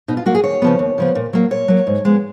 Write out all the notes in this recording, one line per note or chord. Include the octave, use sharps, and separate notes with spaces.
B2 D#4
F4
F#3 A#3 F#4
G#4
D#2 C#5
C#3 F3 B3
D#2
C#3 F3 B3
A#2
F#3 A#3
A#2 C#5
F#3 A#3
G#2
F3 G#3 B3